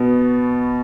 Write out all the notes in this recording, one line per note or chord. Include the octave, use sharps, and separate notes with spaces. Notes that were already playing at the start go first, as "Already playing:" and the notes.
Already playing: B2 B3 F#4